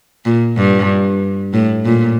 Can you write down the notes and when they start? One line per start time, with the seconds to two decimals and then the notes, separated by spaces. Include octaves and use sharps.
0.25 A#2
0.56 G2
1.54 A2
1.85 A#2